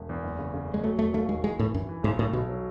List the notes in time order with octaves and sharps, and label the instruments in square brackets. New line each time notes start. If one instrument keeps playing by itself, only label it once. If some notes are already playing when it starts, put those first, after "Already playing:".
Already playing: [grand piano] E1
E2
F#1
C#3
C#3
C#3
[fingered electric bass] G#3
[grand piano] F#3 [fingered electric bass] A3
[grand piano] E1 [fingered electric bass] A3
[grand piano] D#2 [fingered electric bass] A3
[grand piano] D#3 [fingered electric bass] G#3
[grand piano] E3 [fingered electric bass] G#3
[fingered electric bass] A2 [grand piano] E3
[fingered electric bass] F#2 [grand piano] E3
[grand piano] E3
[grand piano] B1 [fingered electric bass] G#2
[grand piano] B1 [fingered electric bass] A2
[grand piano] B1 [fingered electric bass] B2
[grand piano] F#3